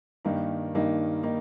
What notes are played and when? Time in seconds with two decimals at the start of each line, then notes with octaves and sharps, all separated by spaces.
0.25 G2 D#3 A#3 D#4
0.75 G2 D#3 A#3 D#4
1.23 D#3 A#3 D#4